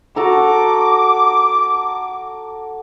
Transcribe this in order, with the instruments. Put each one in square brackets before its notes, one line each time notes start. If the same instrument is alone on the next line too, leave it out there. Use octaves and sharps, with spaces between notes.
[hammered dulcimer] F#4 A4 A#5 [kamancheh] D6